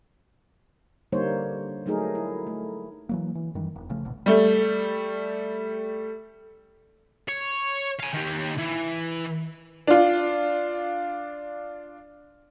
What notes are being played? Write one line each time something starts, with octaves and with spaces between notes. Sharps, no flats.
D3 G3 A#3 D#4 C5 C#5
F#3 A3 D#4 G#4 A#4
E4
A3
E3 F#3 A#3
E3
F#2 D#3 E3 G3
E1
A1 C#3 F3 A3
D1 G1 G2 B2
G3 A3
C#5
F5 G#5
D#3 G4
E3
D4 F4